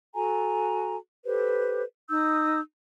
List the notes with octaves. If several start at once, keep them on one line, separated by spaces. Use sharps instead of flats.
F#4 A4 G#5 A#5
G4 A4 B4 C5
D#4 D#6 E6 G6